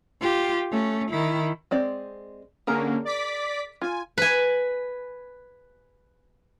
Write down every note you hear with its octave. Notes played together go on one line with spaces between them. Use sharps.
F4 G4
A3 C#4
D#3 E4
G#3 C4 D5
D3 A#3 C#4 G#4 A#4 A#5
D5 D6 B6
F4 G#5
B4 G#5